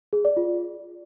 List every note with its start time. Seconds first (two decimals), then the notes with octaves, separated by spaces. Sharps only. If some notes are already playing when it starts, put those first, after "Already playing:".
0.13 G#4
0.25 D5
0.37 F4